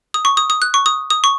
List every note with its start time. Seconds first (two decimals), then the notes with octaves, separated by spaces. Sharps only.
0.14 D#6
0.25 C#6
0.37 D#6
0.50 D#6
0.62 F#6
0.74 C#6
0.86 D#6
1.10 D#6
1.24 C#6